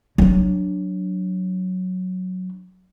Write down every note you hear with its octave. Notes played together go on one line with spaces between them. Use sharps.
F#3 D4